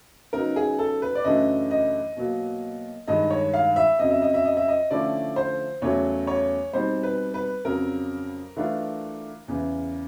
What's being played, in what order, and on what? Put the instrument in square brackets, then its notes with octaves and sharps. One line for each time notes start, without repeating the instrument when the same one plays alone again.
[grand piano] C#3 F#3 B3 D#4 A#4
G#4
A4
B4
D5
F#2 C#3 E3 A3 D4 D#5
D#5
B2 F#3 A#3
G2 D#3 G#3 D#5
C#5
F5
E5
F2 C#3 F#3 D#5
E5
D#5
E5
D#5
E5
D#5
D3 F3 A3 C#4 E4 D5
C5
E2 C#3 F#3 A3 C#5
C#5
B2 G3 C4 D#4 C5
B4
B4
F2 C#3 F#3 A#4
E3 A3 D4 F4
E2 C#3 E3